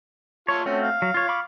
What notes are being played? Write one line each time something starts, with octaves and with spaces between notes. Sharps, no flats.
F4 C#5 A5 C#6
A3 C4 C#4 F#4
F5
F#3
F4 C#5
B5 C#6 D6